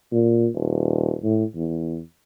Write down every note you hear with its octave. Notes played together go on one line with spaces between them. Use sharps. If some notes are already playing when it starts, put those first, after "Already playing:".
A#2
D#1
A2
E2